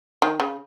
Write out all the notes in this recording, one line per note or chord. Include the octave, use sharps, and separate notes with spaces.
D#3
C#3